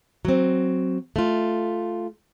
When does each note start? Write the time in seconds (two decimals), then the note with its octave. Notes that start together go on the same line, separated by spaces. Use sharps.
0.25 F#3 C4
1.16 A3 F4